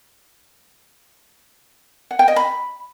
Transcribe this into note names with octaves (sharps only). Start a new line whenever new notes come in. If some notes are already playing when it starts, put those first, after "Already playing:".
F#5
G5
D#5
B5